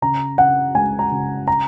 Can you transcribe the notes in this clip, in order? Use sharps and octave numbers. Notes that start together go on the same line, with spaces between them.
C#3 A#5
C#3 F#5
G#3 G#5
A#5
C#3
A#5